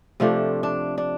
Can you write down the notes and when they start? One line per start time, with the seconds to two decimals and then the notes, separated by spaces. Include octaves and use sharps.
0.20 C3 F3 A3 D4
0.63 D4
0.98 D4